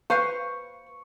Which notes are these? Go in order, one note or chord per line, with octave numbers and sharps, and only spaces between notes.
B4 C5 F5 C#6